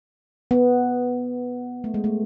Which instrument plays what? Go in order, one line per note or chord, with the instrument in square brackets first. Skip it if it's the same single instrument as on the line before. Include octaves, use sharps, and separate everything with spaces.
[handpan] B3
A3
G#3
A3